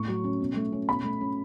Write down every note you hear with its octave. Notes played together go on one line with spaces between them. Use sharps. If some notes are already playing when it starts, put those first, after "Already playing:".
Already playing: A2 C#6
F#3
C#4
B2
A3
C#4
B2 B5
A3
C#4